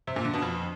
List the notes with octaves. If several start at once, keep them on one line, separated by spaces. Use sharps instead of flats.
C3
A#2
D3
B2
F2